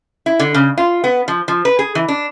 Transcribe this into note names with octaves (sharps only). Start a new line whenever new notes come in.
E4
D3
C#3
F4
B3
F3
F3
B4
G#4
E3
D4